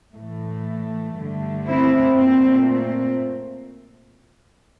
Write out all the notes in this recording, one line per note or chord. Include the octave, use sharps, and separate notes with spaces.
A2 E3 A3
G2 D3 A3
C4 E4
A#2 A3 C4
C4